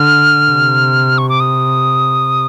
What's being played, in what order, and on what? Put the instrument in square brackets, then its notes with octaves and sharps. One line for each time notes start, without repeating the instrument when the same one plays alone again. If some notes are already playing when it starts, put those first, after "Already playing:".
Already playing: [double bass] D3 [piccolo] F6
[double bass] C3
[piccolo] C#6
D6
D#6